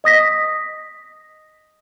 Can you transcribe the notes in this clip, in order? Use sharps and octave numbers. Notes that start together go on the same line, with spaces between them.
D#5 D#6 A#6 B6